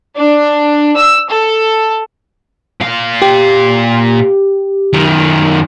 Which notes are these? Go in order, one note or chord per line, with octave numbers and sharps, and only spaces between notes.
D4
E6
A4
A#2 F5
G4
F#2 D#3